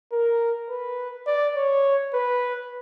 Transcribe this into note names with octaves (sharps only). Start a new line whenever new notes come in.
A#4
B4
D5
C#5
B4